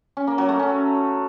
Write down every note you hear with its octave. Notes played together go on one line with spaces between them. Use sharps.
C#4
A#3
F#3
A3
C#4